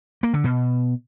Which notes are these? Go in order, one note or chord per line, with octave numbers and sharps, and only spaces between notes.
A#3
D3
B2